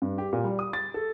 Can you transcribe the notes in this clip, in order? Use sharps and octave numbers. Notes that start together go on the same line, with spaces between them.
G2
G4
A#2
G3
D#6
A6
A4